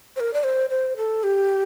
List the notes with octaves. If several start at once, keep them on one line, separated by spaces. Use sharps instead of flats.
C5
A#4
D5
C5
C5
A4
G4